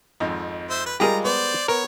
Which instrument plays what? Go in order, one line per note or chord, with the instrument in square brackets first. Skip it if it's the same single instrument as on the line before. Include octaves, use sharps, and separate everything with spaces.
[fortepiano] G#1 F2 D#4
[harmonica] C5 E5
B4
[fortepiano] G3 G#3 F4 [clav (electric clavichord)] G4 G#4 A#4 [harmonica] A#5
[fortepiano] B3 [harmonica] C5 D5
[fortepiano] B3 [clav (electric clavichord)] A#4 [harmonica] C#5